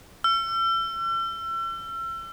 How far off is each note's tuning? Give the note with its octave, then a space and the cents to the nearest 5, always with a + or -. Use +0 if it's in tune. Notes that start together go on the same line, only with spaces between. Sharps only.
E6 +40